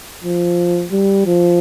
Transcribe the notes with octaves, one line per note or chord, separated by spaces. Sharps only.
F3
G3
F3